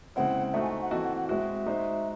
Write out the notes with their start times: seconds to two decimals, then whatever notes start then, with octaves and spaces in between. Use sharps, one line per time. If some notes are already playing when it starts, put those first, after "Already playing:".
0.16 C#3 G#3 C4 E4 C5 F#5
0.53 A3 D#4 F#4 C5 E5
0.62 G#5
0.82 F#5
0.91 E3 C4 F#4 A4 D#5
1.04 F#5
1.17 F#5
1.29 G#3 C4 F#4 E5
1.66 G#3 D#4 F#4 C5